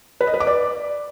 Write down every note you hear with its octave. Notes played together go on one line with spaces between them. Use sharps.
B4
D#5
B4
D6
D5